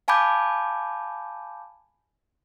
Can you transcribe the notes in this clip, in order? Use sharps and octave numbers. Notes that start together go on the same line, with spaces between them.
F5 G#5 A5 B5 D6 G6